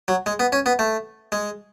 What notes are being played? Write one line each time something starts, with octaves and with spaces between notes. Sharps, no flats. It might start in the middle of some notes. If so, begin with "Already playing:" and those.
F#3
G#3
B3
C#4
B3
A3
G#3